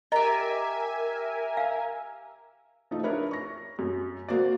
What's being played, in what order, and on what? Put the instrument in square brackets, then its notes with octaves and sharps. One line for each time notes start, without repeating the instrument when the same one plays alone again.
[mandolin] G4 A#5 [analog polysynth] A#4 E5 G#5 [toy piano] D#5
[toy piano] F5
[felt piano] F3 A3 D#4
D4 A#4 B4 C#5 E5
C#6 A#6
F#2
F#3 A#3 F#4 C5 D5